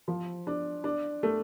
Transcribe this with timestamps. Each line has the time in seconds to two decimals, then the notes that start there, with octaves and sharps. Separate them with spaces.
0.08 F3
0.47 D4
0.84 D4
1.23 A3